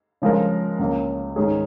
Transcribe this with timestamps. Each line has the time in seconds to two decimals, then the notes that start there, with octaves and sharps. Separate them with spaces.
0.22 C#3 F3 G#3 F4 A#4
0.79 C#2 C#3 A#3
1.36 G#2 D#3 C#4 G#4